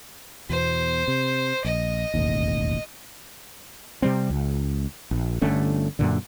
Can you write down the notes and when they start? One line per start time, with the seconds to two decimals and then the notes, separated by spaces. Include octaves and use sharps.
0.49 E2 B2 C5
1.08 C3
1.65 A#1 D#5
2.14 E1 A1 D#2
4.02 C3 G3 C4
4.30 C#2
5.11 A#1
5.42 G1 D3 A3 C#4
5.99 F#2 A#2 D3